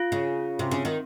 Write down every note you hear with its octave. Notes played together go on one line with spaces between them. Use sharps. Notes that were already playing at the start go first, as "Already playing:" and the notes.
Already playing: F4
C#3
C3
C#3
D#3